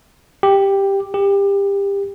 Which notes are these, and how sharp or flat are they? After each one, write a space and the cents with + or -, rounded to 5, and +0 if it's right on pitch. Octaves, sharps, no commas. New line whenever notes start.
G4 +5
G4 +25